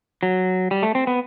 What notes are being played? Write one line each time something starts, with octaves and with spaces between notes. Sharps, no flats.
F#3
G3
A3
C4
B3